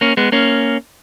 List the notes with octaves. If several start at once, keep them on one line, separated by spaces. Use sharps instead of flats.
A#3 C#4
G#3 B3
A#3 C#4